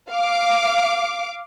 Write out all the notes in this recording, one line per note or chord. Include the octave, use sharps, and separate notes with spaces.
F5 D6